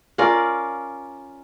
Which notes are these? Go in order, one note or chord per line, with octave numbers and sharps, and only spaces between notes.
C#4 F4 A#4 D5